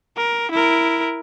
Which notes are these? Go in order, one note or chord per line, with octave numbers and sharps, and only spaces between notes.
A#4
E4 A#4